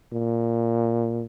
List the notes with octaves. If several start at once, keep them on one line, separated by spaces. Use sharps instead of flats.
A#2